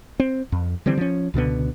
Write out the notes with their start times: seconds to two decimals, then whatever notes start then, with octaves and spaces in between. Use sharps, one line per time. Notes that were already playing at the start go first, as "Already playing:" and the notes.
0.20 C4
0.52 F2
0.86 D3 E3 G3 C4
0.98 F3 C#4
1.34 C#2 B2 D3 B3